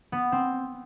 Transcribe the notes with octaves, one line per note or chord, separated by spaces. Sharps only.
B3
C4